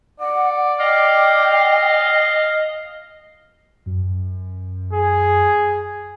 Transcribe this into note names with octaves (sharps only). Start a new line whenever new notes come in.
D5 F#5
D#5 F5 G5
F#2
G#4